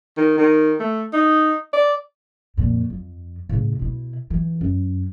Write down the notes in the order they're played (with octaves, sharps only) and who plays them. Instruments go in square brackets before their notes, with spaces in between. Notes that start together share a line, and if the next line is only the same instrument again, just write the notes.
[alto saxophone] D#3
D#3
A3
D#4
D5
[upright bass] F2 A#2
F2
A2 C#3
B2 E4
E3
F#2